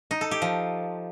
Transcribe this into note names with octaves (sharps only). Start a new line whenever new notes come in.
D#4
A4
G4
F3